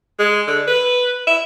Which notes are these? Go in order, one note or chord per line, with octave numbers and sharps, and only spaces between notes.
G#3
D3
B4
E5